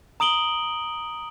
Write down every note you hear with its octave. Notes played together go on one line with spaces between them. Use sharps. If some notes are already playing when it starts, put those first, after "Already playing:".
A#5 D#6 D7 F#7 G7